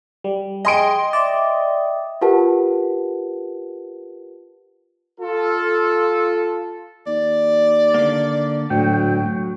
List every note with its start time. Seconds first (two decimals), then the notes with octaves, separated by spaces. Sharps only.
0.24 G3
0.65 G#4 D#5 G5 C6 D7
1.13 D5 E5 G5 D#6
2.21 F4 G4 A#4 B4 F#5 A5
5.20 F4 A4
7.07 D#2 D5
7.94 D3 A#3
8.70 D2 A2 F#3 G5